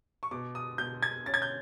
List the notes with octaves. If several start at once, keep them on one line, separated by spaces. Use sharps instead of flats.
C#6
B2 D6
D#6
B2 G6
G#6
C#4 A6
G#6
G6